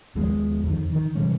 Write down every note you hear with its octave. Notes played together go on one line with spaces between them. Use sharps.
D#2 F3 G#3 B3
F2 D#3
D#3
C3 E3 G3 C#4